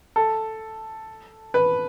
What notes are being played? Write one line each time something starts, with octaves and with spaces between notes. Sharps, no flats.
A4
B4